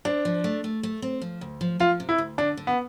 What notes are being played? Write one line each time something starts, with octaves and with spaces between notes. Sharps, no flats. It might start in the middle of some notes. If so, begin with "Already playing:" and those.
C4 D4
F3
A3
A3
A3
C4
F3
D2
F3
F3 F4
C3
E4
D2
D3 D4
D3
B3